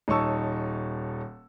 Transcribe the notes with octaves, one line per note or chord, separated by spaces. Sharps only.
D#1 D#4 C#5 A5 C#6 E6